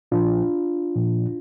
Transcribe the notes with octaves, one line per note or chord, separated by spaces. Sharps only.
A#2 F3 D4 F4
A#2 F3